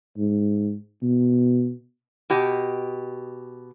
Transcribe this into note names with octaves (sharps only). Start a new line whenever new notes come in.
G#2
B2
B2 G4 D#5